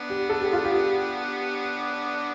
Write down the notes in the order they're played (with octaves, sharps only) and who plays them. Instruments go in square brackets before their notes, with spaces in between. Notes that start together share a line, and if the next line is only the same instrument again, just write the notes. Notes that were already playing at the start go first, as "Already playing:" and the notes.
Already playing: [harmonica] B3 D4
[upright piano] G4
A4
G4
F4
G4